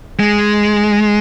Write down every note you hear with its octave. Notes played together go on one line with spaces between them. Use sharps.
G#3